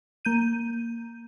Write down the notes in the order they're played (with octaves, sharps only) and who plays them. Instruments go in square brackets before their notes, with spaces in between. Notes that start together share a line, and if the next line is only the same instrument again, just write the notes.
[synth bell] A#3 G6 D#7